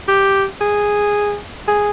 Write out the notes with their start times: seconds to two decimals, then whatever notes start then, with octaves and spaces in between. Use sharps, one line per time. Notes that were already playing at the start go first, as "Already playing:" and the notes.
0.08 G4
0.61 G#4
1.68 G#4